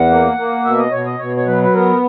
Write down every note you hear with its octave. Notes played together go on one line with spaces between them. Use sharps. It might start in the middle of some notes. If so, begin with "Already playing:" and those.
Already playing: E2 F#5
A#3
A#3
B2 E5
D#5
B2 C#5
D#5
B2 C#5
C#5
F#3 B4
B4
B3 A#4